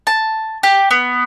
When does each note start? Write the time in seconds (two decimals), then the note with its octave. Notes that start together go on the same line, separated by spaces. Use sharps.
0.07 A5
0.63 G4
0.91 B3